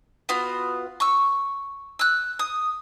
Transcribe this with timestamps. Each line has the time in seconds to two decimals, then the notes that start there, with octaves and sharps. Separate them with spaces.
0.29 B3 F4 F#4
1.00 C#6 E6
1.99 E6 F#6
2.39 D#6